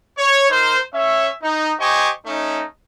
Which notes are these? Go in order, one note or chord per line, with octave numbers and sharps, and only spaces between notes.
C#5
D#4 A#4 C5
C#4 C#5 E5
D#4
G4 C5 D#5 G#5 C#6
A3 C#4 D#4